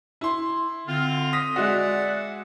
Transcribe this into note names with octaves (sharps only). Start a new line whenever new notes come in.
E4 C6
D3 C4 F4
D#6 A#6 B6
G#3 F#4 D5 E5 F#5